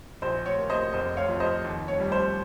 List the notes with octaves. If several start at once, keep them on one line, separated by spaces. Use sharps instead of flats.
A#1 C5
C#5
A#3
C5 D#5
F1 C5 D#5
C#5 F5
F2
C5 D#5
D#2
C#5
G3
C5